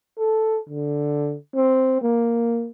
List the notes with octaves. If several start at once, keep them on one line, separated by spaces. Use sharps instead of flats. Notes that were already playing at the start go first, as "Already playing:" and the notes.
A4
D3
C4
A#3